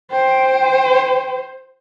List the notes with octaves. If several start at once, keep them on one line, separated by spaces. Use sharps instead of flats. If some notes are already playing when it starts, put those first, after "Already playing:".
C5 G5